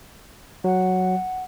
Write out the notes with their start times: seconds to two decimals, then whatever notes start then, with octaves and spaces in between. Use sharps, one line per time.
0.64 F#3 F#5